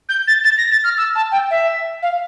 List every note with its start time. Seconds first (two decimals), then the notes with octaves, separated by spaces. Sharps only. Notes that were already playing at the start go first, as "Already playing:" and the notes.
0.09 G6
0.27 A6
0.44 A6
0.58 A#6
0.71 A6
0.84 F6
0.97 E6
1.15 A5
1.32 G5
1.50 E5
2.02 F5